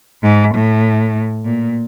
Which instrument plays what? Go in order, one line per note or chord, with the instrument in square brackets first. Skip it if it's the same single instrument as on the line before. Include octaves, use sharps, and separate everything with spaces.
[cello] G#2
A2
A#2